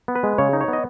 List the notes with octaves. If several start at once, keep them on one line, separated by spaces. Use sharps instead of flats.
B3
B4
G#3
C#3 C#5
D#4
C#5
B3 D#5